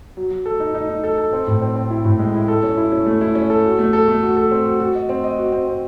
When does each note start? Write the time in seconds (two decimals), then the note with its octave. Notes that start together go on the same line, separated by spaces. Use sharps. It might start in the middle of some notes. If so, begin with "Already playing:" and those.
0.17 F#3
0.31 F#3
0.46 A4
0.60 D#4
0.75 D#4
0.89 D#4
1.04 A4
1.18 A4
1.33 C4
1.47 A2
1.61 C4
1.76 C4
1.90 E4
2.05 A2
2.19 G#3
2.34 E4
2.48 A4
2.63 C#4
2.77 E4
2.92 C#4
3.06 A3
3.21 E4
3.35 C#4
3.50 A4
3.65 F#4
3.79 A3
3.93 A4
4.08 A3
4.23 F#4
4.37 A4
4.51 C4
4.66 F#4
4.80 F#4
4.95 D#5
5.09 C4
5.24 D#5
5.38 F#4
5.52 C4
5.67 C4